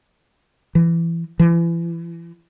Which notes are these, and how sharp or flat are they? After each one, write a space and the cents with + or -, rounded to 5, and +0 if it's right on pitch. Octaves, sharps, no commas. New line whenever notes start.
E3 +25
E3 +35